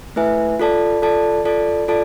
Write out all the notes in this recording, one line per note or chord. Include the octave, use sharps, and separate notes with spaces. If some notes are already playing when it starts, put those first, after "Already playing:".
A3 E4 B4 E5 G#5
F4 A4 D5 A5
F4 A4 D5 A5
F4 A4 D5 A5
F4 A4 D5 A5